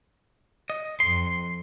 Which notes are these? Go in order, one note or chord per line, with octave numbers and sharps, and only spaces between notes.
D#5
F2 C6